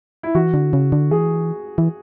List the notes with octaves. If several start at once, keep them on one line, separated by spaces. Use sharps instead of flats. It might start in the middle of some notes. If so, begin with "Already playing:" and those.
E4
E3 F#4
D3
C#3
D3
E3 G#4
E3